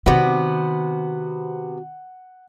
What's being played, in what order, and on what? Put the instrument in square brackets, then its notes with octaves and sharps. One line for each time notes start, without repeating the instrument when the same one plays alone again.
[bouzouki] C3 B3 [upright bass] D#3 [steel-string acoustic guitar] F#4 [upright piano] F#5